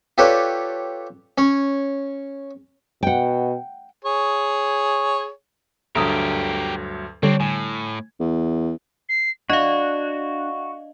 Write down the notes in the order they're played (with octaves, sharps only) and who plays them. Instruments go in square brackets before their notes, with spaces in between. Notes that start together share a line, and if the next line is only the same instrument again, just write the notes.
[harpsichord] F4 G4 A4 B4 C#5 D5
C#4 C#5
[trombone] B2 [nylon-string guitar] F#5 G5
[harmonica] G#4 C#5
[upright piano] D2 G2 F#3 [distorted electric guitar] G4 A#4 [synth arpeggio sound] A#5 D#6 E6
[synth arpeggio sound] D3 G3 [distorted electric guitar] C4 D4 [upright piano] C#5
[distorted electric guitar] A2 [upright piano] G#5
[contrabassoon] E2
[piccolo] C7
[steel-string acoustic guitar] D4 [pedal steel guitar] F#4 [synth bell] D#5 F5